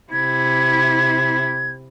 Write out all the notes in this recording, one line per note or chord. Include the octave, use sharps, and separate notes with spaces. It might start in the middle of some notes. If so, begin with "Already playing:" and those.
C3 E4 G#6